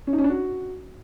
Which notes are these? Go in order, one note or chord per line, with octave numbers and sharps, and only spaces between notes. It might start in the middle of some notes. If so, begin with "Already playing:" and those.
C#4
D#4
C#4
D4
F#4